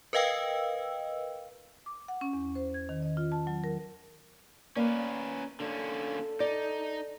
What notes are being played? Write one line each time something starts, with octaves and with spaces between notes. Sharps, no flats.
A#4 B4 D#5 F5 G5 E6
D6
F#5
C#4
E2
C5
G#6
D#3
D#5
F4
A5
F#3
A#4
A#3 C#4 B4 D5
D3 A#3 C#4 D4 A4
D#4 D5